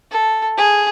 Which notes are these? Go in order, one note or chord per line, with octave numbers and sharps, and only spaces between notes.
A4
G#4